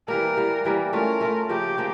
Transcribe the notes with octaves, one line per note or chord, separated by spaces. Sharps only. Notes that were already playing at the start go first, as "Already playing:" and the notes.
E3 G3 A#3 A#4
E3 G3 A#3
E3 G3 A#3
A3 C#4 F4 A#4
A3 C#4 F4
C#3 F3 A#3 G4
C#3 F3 A#3